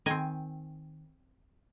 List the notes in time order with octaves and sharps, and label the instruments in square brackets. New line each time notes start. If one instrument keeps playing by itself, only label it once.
[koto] D#3 C4 D#5 G#5